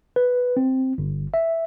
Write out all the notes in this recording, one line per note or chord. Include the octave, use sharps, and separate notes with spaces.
B4
C4
G1
E5